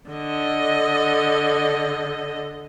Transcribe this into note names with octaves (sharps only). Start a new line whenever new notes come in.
D3 D#5